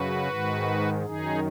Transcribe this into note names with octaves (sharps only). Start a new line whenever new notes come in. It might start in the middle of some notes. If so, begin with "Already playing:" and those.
Already playing: F#2 C#3 F#4 B4
G#2 D#3
F#2 D#3 D#4 G#4